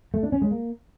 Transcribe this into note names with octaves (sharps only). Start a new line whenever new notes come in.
A3
D4
C#4
G#3
A#3